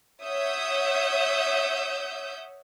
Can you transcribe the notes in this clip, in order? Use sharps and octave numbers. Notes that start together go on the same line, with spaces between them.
C#5 E5 F#5 D#6 E6 G6